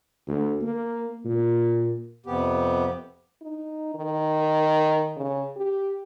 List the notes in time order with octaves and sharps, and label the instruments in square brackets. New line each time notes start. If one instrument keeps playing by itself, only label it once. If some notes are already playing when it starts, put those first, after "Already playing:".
[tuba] D2
A#3
A#2
[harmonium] F2 C3 B3 G4
[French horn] D#4
D#3
C#3
G4